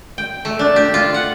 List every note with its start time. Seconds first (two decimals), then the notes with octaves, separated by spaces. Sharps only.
0.18 G5
0.45 A3
0.59 D4
0.76 G4
0.94 F4
1.14 F#5